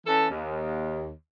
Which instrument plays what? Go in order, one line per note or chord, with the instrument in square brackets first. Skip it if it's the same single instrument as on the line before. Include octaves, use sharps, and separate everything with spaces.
[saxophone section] E3 C#4 A4
D#2